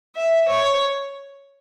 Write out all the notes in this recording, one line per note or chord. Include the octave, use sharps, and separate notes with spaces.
E5
C#5